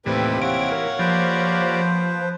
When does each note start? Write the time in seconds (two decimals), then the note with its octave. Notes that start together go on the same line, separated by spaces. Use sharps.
0.06 D#2 A2 C3 E3 G3 C4 B4 G5
0.42 E3 C#5 F5 F#5 D7
0.72 A#4
0.99 F3 A#3 G4 B4 C5 D5